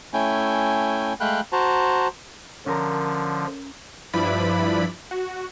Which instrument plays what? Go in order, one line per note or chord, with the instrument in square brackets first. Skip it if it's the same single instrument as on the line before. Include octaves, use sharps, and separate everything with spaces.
[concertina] A3 C#4 E4 G5 G#5
G#3 A3 F5 G5 B5 F#6
F#4 C5 A5 A#5
[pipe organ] D3 F3 [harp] C#4 A#4 A#5
[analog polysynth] G2 F3 E4 B4 D5 B5
F#4